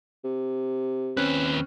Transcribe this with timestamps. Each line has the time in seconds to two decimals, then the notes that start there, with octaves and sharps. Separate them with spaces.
0.24 C3
1.17 D#2 C4 C#4 B4 F#6